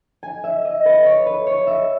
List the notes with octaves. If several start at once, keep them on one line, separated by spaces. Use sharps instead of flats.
G#5
E5
D#5
B4
C#5
B4
C#5
E5